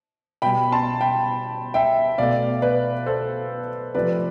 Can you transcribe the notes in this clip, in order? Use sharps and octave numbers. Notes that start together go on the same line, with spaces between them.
B2 G3 G5 B5
A5 C6
G5 B5
E5 G5
B2 A3 D5 F5
B4 D5
A4 C5
C3 F3 A3 B4 D5